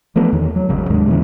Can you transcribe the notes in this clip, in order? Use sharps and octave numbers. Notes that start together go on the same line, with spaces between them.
E3 F3 A3 B3
E2 D#3
F#3
G#1 C#3 F#3
D#2 G#2 G#3 D4
A#2 C#3 E3 G#3